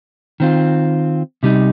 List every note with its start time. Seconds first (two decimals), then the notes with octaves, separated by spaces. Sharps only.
0.40 D#3 C4 F4
1.43 C3 G3 D#4